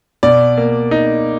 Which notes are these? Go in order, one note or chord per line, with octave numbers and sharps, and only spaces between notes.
B2 D5
A#3
D#4